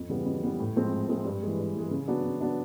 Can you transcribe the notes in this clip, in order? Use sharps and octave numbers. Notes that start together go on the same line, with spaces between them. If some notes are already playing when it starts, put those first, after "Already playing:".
Already playing: F2
C#3 E3 G3 B3
F2
C#3 E3 G3 B3
A2
F3 G#3 C4
A2
F3 G#3 C4
G2
G#3
E3
G2
E3 G#3
C#3
F#3 B3 D4
C#3
F#3 B3 D4